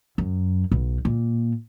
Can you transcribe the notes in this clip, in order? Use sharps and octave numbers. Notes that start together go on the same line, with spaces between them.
F#2
B1
A#2